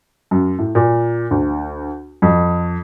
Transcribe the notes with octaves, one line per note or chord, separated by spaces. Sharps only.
F#2
A2
A#2
D2
F2